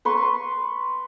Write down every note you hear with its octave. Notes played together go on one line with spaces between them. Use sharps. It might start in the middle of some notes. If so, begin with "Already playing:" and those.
B4 C6 C#6